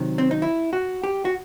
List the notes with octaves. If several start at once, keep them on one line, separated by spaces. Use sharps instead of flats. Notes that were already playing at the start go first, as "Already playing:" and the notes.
Already playing: C3 D#3 F#3
C4
D#4
E4
F#4
G4
F#4